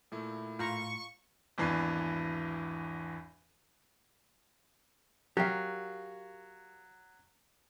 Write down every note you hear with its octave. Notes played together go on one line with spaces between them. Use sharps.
A#2 A3 E4
A2 F4 A#5 C#6
G#1 E2 E3 D4 C7
F#3 G4 A#4 F5